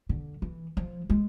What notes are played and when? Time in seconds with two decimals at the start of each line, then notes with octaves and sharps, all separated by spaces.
0.09 D3
0.42 E3
0.77 F3
1.10 G#3